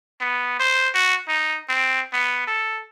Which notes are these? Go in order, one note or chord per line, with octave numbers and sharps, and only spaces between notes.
B3
C5
F#4
D#4
C4
B3
A4